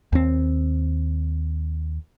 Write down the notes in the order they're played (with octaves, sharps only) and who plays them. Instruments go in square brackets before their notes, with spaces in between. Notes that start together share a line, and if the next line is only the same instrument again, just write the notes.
[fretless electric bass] D#2 C4